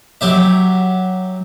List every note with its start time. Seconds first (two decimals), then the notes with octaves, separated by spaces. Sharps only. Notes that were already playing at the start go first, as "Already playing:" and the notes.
0.21 F#3 G4 E5